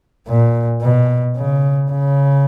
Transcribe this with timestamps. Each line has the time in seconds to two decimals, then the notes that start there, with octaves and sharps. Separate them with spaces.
0.28 A#2
0.82 B2
1.37 C#3
1.91 C#3